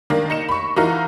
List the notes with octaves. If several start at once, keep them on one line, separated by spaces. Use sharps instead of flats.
D#3 A#3 D4
D#4 C#7 E7
B5 C#6
E3 D#4 F4 F#4 A#4